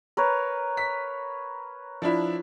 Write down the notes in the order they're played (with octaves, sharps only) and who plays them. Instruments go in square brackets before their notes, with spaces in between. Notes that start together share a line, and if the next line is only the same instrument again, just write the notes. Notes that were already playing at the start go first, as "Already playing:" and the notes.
[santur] A#4 B4 C#5
[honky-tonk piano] B6
F3 D4 E4